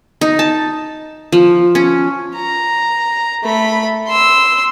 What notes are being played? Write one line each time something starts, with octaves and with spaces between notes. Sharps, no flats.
D#4
A5
F3
C#4
A#5
A3 B5
C6 E6